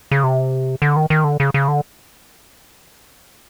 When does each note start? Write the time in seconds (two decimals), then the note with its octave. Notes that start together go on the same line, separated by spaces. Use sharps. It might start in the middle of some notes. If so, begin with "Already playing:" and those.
0.11 C#3
0.24 C3
0.82 D3
0.96 D#3
1.10 D#3
1.24 D3
1.40 C#3
1.54 C#3
1.68 D3